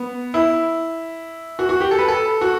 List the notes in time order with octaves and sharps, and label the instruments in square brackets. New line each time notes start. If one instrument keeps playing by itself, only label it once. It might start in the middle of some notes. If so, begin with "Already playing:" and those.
Already playing: [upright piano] B3
E4
F#4
F#4
G4
A4
B4
A4
F#4